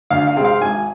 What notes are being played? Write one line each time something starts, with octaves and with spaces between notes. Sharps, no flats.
D2 F5
F5
C3 G#3 C4
F5
G#1 G#5